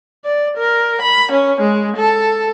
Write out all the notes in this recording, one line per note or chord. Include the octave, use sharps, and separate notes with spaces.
D5
A#4
B5
C#4
G#3
A4